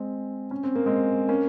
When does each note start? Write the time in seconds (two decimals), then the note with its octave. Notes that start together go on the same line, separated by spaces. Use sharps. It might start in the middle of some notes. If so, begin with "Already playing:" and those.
Already playing: G#3 C4
0.51 C#4
0.64 C4
0.75 A#3
0.86 G#3 C4
1.28 A#3 C#4